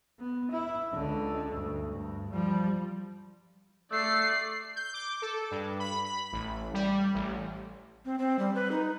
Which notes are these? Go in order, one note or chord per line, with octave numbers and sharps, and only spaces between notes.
B3
E4
C#2 D3
D2 G2
G2
F3 G3
A3 D5 C7
G6
D6
A4
G2
B5
B5
A1
G3
A1
C4
C4
G3
B4
D#4